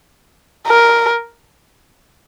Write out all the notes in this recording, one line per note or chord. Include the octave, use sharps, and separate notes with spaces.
A#4